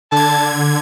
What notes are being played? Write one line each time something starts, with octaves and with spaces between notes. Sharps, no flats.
D3 A5 G#6